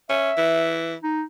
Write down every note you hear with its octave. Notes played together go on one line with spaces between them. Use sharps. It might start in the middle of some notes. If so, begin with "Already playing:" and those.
C#4 E5
E3
D#4